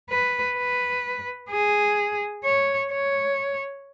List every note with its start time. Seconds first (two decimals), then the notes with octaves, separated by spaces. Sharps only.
0.10 B4
0.57 B4
1.50 G#4
2.44 C#5
2.91 C#5